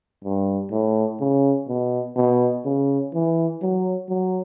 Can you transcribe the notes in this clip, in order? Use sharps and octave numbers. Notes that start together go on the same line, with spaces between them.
G2
A2
C#3
B2
B2
C#3
E3
F#3
F#3